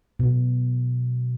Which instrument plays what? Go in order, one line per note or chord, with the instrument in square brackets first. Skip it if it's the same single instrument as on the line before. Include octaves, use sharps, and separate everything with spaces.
[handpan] B2